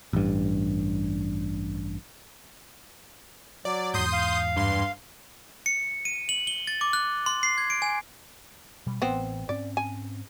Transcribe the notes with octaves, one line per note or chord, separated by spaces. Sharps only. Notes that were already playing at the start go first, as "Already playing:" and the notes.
A1 G2
F#3 D5
E2 G#2 C6 D#6 G6
F5
G2 C6
C#7
D#7
F#7
G7
A6
D6
F#6
C6
C7
G#6
D7
G#5
B2 G3
A1 B3 C4
G#2 C4 C#4 D5
G#5